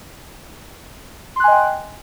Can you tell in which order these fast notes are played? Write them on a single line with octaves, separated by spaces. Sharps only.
C6 F#6 G#5 D#5 G5